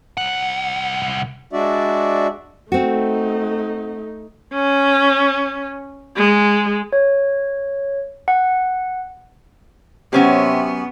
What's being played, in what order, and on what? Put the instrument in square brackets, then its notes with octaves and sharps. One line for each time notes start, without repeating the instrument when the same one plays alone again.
[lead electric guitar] C2 F#5
[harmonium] G#3 D4 F#4 D5 E5
[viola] A3 D#4 [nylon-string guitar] C4 F#4
[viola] C#4
G#3
[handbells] C#5
F#5
[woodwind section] C3 [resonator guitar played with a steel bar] F#3 C#4 G4 [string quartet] B3